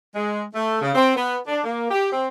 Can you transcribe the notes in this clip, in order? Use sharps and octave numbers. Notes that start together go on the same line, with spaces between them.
G#3
A3
C#3
C4
B3
D4
A#3
G4
C4